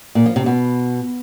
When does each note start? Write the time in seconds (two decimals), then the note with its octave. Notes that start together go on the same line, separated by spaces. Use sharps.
0.15 A#2
0.26 F3
0.36 C3
0.46 B2